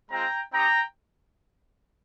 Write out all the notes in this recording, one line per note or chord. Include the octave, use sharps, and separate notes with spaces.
G#3 C4 F4 G5 A#5
C4 D#4 G4 G5 A#5